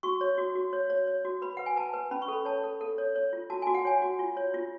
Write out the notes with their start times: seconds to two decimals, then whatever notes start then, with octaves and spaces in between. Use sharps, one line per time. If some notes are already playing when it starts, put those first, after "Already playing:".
0.03 F#4 C#6
0.21 C#5
0.38 F#4
0.55 F#4
0.73 C#5
0.90 C#5
1.07 C#5
1.25 F#4
1.42 B4 B5
1.57 B4 F#5
1.66 G#5
1.76 B4 A5
1.93 B4
2.11 C#4 B5
2.22 C#6
2.28 A4 B5
2.45 C#5 A5
2.64 A4
2.81 A4
2.98 C#5
3.16 C#5
3.33 F4
3.50 F#4 A5
3.62 F#4 G#5
3.75 F#5
3.85 C#5 G#5
4.02 F#4
4.19 F4
4.37 C#5
4.54 F4